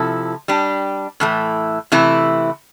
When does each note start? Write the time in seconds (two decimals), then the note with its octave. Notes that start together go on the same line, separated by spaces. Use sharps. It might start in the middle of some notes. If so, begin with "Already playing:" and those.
Already playing: C3 F3 E4 A4
0.48 G3 D4 G4
1.20 A2 E3 A3
1.92 C3 E3 A3 E4